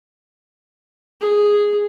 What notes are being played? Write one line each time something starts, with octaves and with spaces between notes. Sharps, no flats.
G#4